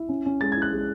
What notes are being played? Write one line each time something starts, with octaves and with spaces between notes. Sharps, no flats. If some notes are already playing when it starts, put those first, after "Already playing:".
Already playing: E4
C#4
C#4
G#3 A6
G#6
E4
F#6
G#3